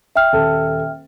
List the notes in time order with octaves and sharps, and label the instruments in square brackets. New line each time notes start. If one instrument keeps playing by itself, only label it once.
[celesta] E5 G5 F6
[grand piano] D#1 A4 A5